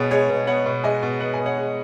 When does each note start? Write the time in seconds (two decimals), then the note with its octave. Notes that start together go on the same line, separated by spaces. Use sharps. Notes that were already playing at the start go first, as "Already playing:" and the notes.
Already playing: B2 B3 G#4 C#5
0.11 G#3 G#4 C#5
0.29 B2
0.47 B3 C#5 F#5
0.66 B2
0.84 G#3 D#5 G#5
1.03 B2
1.20 B3 F#5
1.34 G#5
1.39 B2
1.46 C#5 F#5
1.57 G#3